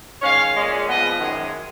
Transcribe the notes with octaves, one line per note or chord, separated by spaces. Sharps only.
D#3 G#3 C#4 C#5 F5
A#2 G#3 C#4
A#2 F3 G#3 B3 B4 D#5
F#2 D#3 G#3